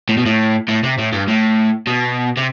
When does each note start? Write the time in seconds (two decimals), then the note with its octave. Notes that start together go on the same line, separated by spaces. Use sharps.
0.09 A2
0.17 B2
0.26 A2
0.68 A2
0.83 C3
0.98 A2
1.13 G2
1.28 A2
1.87 B2
2.37 C3